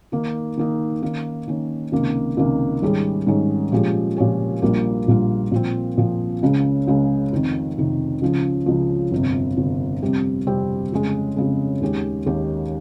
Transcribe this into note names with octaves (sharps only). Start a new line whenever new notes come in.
D#3 A#3 D#4
D#3 A#3 D#4
D#3 A#3 C#4
D#3 A#3 C#4
C#2 C3 D#3 A#3
C#2 C3 D#3 A#3
G#2 D#3 G3 C#4 G#4
G#2 D#3 G3 C#4 G#4
A#2 F3 G#3 C#4 G4
A#2 F3 G#3 C#4 G4
A#1 A#2 G3 A#3 F4
A#1 A#2 G3 A#3 F4
A#2 F3 C4
A#2 F3 C4
C#2 C#3 G#3
C#2 C#3 G#3
F1 F2 C3 D#3
F1 F2 C3 D#3
C#2 C#3 F3
C#2 C#3 F3
G1 F2 C3
G1 F2 C3
F2 C3 G3 C4 G4
F2 C3 G3 C4 G4
F2 C#3 G#3
F2 C#3 G#3
D#2 D#3 G#3 C#4 G4
D#2 D#3 G#3 C#4 G4